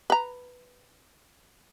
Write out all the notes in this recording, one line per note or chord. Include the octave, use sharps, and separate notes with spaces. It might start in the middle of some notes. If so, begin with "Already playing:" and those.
B4 A#5